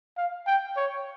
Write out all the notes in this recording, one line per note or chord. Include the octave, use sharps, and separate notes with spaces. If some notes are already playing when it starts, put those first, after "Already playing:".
F5
G5
C#5